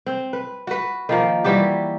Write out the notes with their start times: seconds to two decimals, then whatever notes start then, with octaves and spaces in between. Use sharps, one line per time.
0.06 C4
0.33 B4
0.67 F#4 B4
1.09 D#3 F3 A#3
1.44 E3 G3 F#4 G4